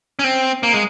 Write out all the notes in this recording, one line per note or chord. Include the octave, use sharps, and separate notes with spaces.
C#4
C4
A#3
G#3